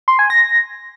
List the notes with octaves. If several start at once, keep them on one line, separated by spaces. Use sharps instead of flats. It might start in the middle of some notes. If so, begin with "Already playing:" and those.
C6
G#5
A#6